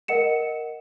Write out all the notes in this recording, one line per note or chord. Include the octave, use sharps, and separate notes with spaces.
A#4 D#5 F#5 C#7 E7